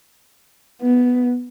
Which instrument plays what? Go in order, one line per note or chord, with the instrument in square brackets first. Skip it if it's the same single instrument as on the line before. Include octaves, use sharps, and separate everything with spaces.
[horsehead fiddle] B3